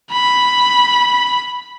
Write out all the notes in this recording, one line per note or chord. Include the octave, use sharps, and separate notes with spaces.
B5